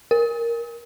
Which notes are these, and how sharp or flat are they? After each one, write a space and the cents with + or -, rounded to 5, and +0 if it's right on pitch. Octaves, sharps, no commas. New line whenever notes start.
A#4 +5